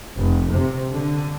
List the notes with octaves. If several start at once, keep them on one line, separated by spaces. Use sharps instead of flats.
F1
C3
D3